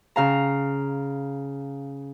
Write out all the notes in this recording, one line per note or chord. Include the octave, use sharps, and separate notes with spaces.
C#3 F5 A#5